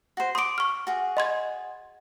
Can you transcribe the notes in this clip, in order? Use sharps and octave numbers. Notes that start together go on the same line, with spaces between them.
F#4 C5
C6 D6 D#6 D7
C#6 F6
F#4 G#4
D#5 C6 G#6